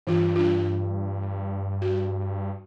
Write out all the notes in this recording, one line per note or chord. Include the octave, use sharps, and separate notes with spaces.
G2 E3 D4 F4
D4 F4
F#4